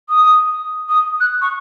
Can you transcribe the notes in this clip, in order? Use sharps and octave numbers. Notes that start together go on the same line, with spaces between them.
D#6
D#6
F#6
C#6